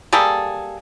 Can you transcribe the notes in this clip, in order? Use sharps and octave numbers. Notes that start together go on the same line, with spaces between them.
G3 A#3 G#4 A4